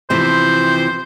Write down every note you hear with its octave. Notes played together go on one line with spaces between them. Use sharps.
C3 E3 F3 C5